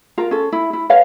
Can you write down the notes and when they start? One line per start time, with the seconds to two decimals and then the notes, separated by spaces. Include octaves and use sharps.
0.18 F4 A#4 A#5
0.31 C#4 A4
0.52 E4
0.73 E4
0.90 B4 C#5 F5